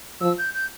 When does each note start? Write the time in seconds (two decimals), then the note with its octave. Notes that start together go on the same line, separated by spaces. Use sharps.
0.21 F3 E6
0.38 G6
0.54 G6